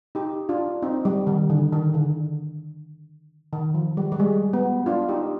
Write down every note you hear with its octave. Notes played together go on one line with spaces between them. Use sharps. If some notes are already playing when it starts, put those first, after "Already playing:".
D#4 G4
D4 F4
C4 D#4
G3
D#3
D3
D#3
D3
D#3
F3
G3
G3
G#3
B3
D4 F4
D#4 G4